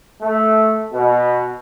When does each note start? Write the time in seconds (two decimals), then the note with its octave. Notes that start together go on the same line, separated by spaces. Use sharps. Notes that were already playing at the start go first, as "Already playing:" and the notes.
0.21 A3
0.93 B2